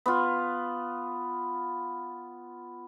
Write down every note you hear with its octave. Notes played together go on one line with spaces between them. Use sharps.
B3 F4